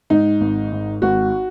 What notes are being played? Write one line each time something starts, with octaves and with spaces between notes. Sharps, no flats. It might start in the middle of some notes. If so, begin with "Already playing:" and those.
G#2 D#4
G#1
G#2
G#1 F#4